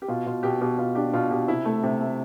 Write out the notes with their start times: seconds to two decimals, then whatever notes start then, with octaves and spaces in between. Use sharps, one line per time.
0.02 G4
0.08 B2 F4
0.26 B2 F4
0.43 B2 G4
0.61 B2 G4
0.78 B2 F4
0.95 D4 G4
1.13 B2 F4
1.30 B2 G4
1.48 C3 E4
1.65 A3
1.83 C3
2.00 A3